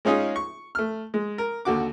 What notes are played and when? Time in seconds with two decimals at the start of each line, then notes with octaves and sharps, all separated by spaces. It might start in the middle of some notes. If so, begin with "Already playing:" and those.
0.05 G#3 C#4 D#4 F4 G#4
0.36 C#6
0.75 A3 F6
1.14 G#3
1.38 A#4
1.65 D#2 D3 F#4 D6